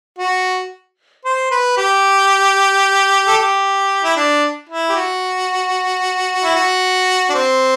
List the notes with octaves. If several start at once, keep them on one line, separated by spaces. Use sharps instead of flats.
F#4
C5
B4
G4
A4
G4
E4
D4
E4
G4
F#4
E4
F#4
D4
C4